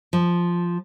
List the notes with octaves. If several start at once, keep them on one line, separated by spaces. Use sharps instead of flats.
F3